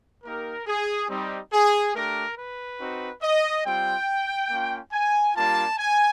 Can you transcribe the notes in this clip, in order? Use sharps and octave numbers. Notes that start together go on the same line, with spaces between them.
A#3 D#4 G4 A#4
G#4
G3 C4 D#4
G#4
A3 D4 G4 A#4
B4
C4 D#4 F#4
D#5
G3 C4 F4 G5
A#3 C#4 F4
G#5
G3 A#3 D4 F4 A5
G#5